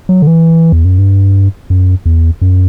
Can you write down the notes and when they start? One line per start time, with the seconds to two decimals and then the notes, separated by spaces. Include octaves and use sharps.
0.09 F#3
0.22 D3
0.27 E3
0.72 E2
0.85 F#2
0.98 G2
1.70 F#2
2.06 E2
2.42 F#2